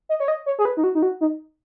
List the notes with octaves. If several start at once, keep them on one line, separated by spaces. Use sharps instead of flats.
D#5
C#5
D#5
C#5
G#4
B4
D#4
F#4
D#4
F#4
D#4